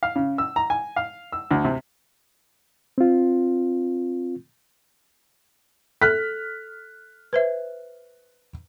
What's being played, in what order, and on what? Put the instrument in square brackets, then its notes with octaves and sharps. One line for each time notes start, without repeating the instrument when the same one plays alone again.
[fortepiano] F5
C#3
E6
A#5
G#5
F5
E6
D2
C3
[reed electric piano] C4 F4
[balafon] A4 [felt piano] F6 F#6 B6
[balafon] B4 C5 E5